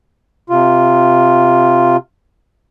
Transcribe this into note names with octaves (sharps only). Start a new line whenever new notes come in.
C3 F4